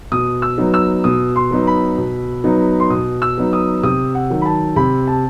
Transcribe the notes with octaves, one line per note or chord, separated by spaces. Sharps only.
B2 D#6
E6
F#3 B3 D#4
E6
B2 D#6
C6
F#3 B3 D#4
B5
B2
F#3 B3 D#4
C6
B2 D#6
E6
F#3 B3 D#4
D#6
C3 D#6
F#5
D#3 F#3
B5
A5
C3 B5
A5